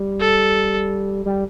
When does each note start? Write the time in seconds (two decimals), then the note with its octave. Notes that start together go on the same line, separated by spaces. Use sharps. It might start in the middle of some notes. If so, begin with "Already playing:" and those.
Already playing: G3
0.20 A4
1.26 G3